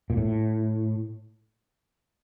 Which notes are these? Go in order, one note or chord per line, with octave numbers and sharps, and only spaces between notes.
A#2
A2